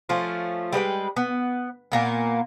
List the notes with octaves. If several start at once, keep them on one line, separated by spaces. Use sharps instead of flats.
F3 A3 C#4 F4
G3 G#3 B4 G5
B3
A#2 A#3 B3